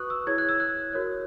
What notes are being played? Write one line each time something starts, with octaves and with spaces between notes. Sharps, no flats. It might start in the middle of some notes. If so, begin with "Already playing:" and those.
Already playing: F#4 B4 C#6 D#6 F#6
E6
E4 G#4 C#5 G#6
F#6
E6
F#6
F#4 A#4 C#5